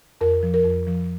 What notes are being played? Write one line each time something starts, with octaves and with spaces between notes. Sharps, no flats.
F2 A#4
F3
A#4
F2
F3